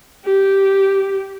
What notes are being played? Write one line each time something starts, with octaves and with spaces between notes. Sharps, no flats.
G4